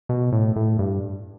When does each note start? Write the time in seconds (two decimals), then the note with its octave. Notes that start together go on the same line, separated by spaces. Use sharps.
0.09 B2
0.32 A2
0.56 A2
0.79 G2